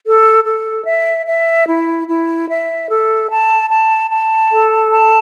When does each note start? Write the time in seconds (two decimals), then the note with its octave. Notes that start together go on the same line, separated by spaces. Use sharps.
0.05 A4
0.45 A4
0.85 E5
1.26 E5
1.67 E4
2.08 E4
2.48 E5
2.88 A4
3.30 A5
3.69 A5
4.10 A5
4.51 A4
4.92 A5